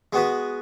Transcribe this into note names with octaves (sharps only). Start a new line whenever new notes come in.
G#3 B3 F#4 B4